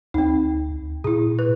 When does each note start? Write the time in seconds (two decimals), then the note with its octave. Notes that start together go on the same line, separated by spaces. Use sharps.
0.14 D2 C4 D#4
1.04 A#2 E4 G#4
1.39 B4